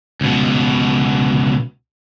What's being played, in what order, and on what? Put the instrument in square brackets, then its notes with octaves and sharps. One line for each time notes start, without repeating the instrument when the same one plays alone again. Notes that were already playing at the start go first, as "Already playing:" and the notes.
[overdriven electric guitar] C#2 B2